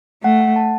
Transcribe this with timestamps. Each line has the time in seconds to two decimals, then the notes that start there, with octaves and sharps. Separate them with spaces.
0.23 A3 F#5
0.41 F#5
0.56 A5